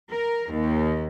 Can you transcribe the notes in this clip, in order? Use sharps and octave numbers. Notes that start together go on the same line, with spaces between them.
A#4
D#2